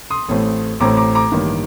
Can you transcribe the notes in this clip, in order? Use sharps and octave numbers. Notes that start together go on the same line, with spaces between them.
C6 D#6
A1 A2 A3 C4
A1 A2 A3 C4 A#5 D6
A#5 D6
A#5 D6
A1 G2 D#3 A#3